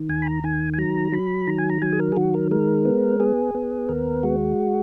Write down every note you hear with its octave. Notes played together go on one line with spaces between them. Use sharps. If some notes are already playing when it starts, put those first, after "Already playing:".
Already playing: D#3
D#2 G#5
B5
A#5
D#3 G#5
G#5
F#3 A#5
F#3 B5
D#3 A#5
G#5
A#5
F#3 G#5
G#4
A#4
G#4
D#3 F#4
A#4
G#3 A#4
B3
B3 G#4
B3
D#2 A#4
G#3 F#4